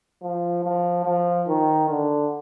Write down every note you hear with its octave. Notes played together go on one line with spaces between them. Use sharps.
F3
F3
F3
D#3
D3